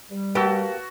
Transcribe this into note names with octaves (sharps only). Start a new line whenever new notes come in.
G3
A#3 F#4 G4 B4 A5 E6